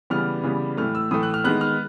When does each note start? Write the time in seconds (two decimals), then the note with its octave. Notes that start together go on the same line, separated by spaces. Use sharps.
0.10 C#3 E3 G3 B3 F6
0.43 C#3 E3 G3 B3
0.77 A2 E3 A3 F6
0.95 E6
1.11 A2 E3 A3 D#6
1.23 F#6
1.34 F6
1.44 D#3 G#3 B3 F#6
1.61 F6